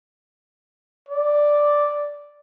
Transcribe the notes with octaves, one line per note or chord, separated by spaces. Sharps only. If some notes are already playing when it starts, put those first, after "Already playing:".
D5